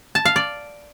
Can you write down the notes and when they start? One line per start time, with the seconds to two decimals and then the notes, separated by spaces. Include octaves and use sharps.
0.15 A5
0.25 F5
0.36 D5